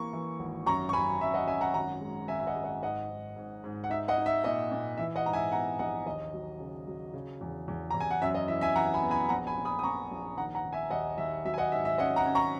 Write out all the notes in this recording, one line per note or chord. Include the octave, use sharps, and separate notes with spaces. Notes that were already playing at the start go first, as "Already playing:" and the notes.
Already playing: E3 A#3 C#6
E3
G#1
F#2 A#5 C#6
C#6
F#2 G#5 B5
F#2 E5
D#5 F#5
F#2 E5 G#5
F#5 A#5
G#1 F#5 A#5
G#3
G#1 E5 G#5
E5
D#5 F#5
G#3
D#5 F#5
G#2 D#5 F#5
G#2
G#2
G#2
F#5
D#4 E5
D#5 F#5
D#4
E5
A#2 D#5
A#2
E3 E5
D#5 F#5
G#2 A#5
E5 G#5
B3 F#5 A#5
A#1 D#5 F#5
D#2 D#5
F#3
C#3
F#3
C#3
E2
E2
E2 A#5
G#5
F#5
F#2 E5
D#5
E3 E5
E5 G#5
E3 F#5 A#5
G#5 B5
B3
G#5 B5
A#1 F#5 A#5
G#5 B5
A#2
B5 D#6
D#6
A#3 A#5 C#6
A#1
D#3 F#5 A#5
F#5 A#5
D#3
E5 G#5
D#2 D#5 F#5
D#2 E5
F#3 E5
G#5
D#5 F#5
G#2 E5
E5
C#4 D#5 F#5
F#5 A#5
C#4
A#5 C#6